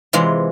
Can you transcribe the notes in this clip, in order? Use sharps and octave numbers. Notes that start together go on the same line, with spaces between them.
C3 E3 G#3 F4